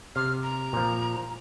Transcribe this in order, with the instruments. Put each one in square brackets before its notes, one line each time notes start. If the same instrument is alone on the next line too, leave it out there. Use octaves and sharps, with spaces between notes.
[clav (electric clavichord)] C3 [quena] F6
[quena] A#5
[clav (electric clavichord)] A#2 F3